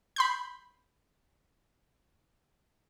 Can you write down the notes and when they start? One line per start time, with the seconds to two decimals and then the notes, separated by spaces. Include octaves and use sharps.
0.16 B5 C6 G6